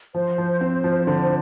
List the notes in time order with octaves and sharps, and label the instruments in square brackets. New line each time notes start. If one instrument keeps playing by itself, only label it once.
[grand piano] F3 [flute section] C5
[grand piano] F3
C4
F3
D3